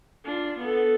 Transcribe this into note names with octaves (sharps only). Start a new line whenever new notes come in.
D4 F4
B3 A4